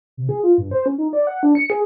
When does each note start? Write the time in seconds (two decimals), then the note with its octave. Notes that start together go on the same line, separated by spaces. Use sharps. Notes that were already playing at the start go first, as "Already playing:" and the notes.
0.17 C3
0.29 G#4
0.43 F4
0.58 G2
0.71 C5
0.86 C#4
0.98 D#4
1.13 D5
1.27 F#5
1.43 D4
1.55 C#7
1.70 G#4